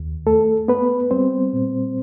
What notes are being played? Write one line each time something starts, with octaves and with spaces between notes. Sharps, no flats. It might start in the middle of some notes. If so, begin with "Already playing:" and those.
Already playing: D#2
A3 A4
B3 B4
G3 C4 C5
A#2